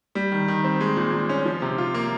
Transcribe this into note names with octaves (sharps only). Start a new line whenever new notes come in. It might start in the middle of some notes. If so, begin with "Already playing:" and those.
G3
D#3
D#3
C4
G#3
A#2
A#2
C#4
F3
C3
F4
A#3